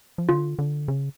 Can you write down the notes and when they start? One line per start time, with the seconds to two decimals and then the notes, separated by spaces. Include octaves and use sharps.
0.18 F3
0.29 D3 F4
0.59 D3
0.88 C#3